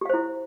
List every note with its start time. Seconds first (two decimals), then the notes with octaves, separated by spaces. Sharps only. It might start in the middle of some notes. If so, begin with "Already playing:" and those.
0.01 G4
0.05 F5
0.10 C5
0.14 E4